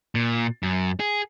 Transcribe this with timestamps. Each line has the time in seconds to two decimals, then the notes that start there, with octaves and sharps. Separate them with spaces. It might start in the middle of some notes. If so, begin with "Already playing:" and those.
0.15 A#2
0.63 F#2
1.00 G#4